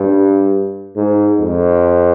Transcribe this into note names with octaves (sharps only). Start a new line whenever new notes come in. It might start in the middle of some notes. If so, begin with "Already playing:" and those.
Already playing: G2
G#2
F2